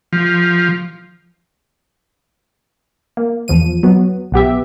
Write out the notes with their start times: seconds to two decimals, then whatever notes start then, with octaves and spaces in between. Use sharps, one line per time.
0.13 F3
3.17 A#3
3.48 E2 F3 D#7
3.83 F#3 B3
4.32 B1 B3 G4 E5